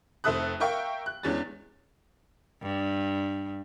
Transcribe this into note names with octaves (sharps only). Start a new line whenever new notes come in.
F1 C4 A4 E5 D#6 F#6
A#4 E5 F5 G5 C#6
F#6
E2 G#3 C#4 D4 A6
G2